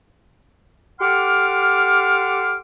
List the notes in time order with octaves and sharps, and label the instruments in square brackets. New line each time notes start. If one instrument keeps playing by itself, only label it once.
[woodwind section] G4 A4 F#5 C6 D6 F6